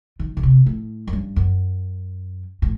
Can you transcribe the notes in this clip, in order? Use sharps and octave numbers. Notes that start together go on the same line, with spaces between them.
D#3
D3
C3
A2
F#2
G2
F#2
A2